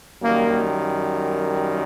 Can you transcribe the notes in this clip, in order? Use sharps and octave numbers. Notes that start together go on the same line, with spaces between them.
F#2 D#3 G3 A#3